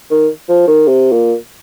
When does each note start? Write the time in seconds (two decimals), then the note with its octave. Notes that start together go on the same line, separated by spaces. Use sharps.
0.11 D#3
0.49 F3
0.67 D#3
0.87 C3
1.12 A#2